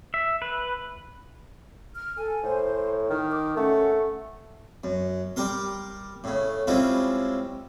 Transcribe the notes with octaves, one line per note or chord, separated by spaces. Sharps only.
E5
B4
F6
A4 G#5
A2 C5
D#3 F6
D6
A3 C#4 F#5
F#2
G3 G4 A#4 C6
A2 C#3
G3 G#3 C4 C#4 E4 F4